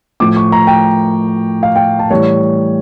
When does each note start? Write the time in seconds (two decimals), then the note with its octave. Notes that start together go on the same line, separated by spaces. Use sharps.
0.20 A2 F3 D6
0.36 C#6
0.52 A#5
0.67 G5
1.63 F5
1.76 G5
1.99 A5
2.10 A2 E3 G3 C#5